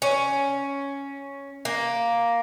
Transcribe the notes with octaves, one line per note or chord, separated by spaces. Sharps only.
C#4
A#3